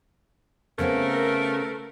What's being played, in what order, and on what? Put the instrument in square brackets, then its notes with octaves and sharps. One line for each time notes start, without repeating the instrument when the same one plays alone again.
[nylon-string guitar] C#3 B3 C4 [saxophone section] A3 A#4